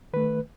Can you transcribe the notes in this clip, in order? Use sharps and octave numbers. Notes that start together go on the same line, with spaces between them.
D#3 A3 B4